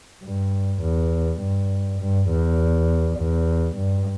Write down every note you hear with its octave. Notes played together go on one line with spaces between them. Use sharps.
G2
E2
G2
G2
E2
E2
G2